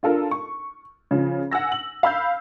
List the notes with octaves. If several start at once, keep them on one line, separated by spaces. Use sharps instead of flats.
D4 F4 A4 A#4
C#6
C#3 F3
F#5 G#5 E6 A#6
F#7
F5 B5 E6 G6